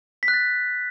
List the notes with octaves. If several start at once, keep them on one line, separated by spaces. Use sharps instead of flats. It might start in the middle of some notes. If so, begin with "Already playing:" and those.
B6
F#6
A6